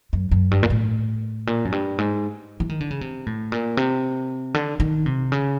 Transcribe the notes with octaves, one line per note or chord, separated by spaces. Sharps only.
F#2
F#2
G2
A#2
A2
A#2
F#2
G2
G#2
E3
D#3
D3
C#3
C3
A2
A#2
C3
D3
D#3
C3
C#3